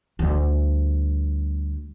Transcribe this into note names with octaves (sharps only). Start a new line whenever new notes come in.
D2 G3